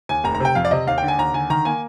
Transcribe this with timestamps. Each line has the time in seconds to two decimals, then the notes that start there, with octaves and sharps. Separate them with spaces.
0.09 D#2 G#5
0.24 F1 A#5
0.34 A#5
0.40 C3 G5
0.55 F2 F5
0.65 D5
0.71 C3 D#5
0.87 D#2 F5
0.98 G5
1.03 D3
1.08 G#5
1.18 D#2 A#5
1.34 D3 G#5
1.50 D#3 A#5
1.65 A#3 G#5